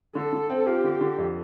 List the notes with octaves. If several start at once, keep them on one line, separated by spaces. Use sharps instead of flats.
D3 A4
D3
C4
F4 G4
D3
D3
F2